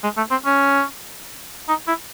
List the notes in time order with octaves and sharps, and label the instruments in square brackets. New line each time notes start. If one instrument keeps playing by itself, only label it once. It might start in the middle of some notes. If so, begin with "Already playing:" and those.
[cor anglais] G#3
A3
C4
C#4
D#4
E4